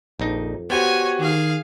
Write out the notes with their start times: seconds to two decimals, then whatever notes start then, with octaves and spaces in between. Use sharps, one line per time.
0.20 A#1 F2 D#4
0.70 B3 F#4 G4 C5 C#5 G#5
1.20 D#3 G#4 F5